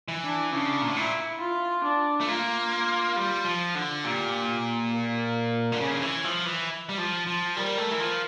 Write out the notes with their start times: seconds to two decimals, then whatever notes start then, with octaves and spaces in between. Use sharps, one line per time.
0.08 E3
0.23 D4
0.52 C#3 D4
0.81 A#2
0.88 A2
0.96 A#2 E4
1.40 F4
1.84 D4
2.21 A3
2.28 A#3 F4
3.16 G3
3.45 F3
3.75 D3
4.04 A#2 G4
4.92 A#4
5.72 D3
5.80 C#3 C#5
5.91 D3
6.02 E3
6.24 F3
6.46 E3
6.89 G3
6.98 F3
7.27 F3
7.56 G3 A#4
7.78 A3
7.91 E3
8.00 F3